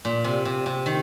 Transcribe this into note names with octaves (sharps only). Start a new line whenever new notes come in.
A#2
C3
C3
C3
D#3